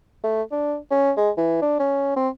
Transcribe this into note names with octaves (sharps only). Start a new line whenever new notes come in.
A3
D4
C#4
G#3
E3
D4
C#4
C4